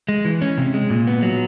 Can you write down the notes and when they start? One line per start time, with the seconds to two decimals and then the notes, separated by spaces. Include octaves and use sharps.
0.09 G#3
0.25 E3
0.42 C#4
0.58 C3
0.74 G#3
0.90 A#2
1.07 B3
1.23 F#3